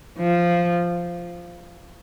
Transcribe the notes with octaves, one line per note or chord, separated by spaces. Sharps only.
F3